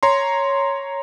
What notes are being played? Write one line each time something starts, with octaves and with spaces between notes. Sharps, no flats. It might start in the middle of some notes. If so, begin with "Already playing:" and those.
C#5 A#5 C6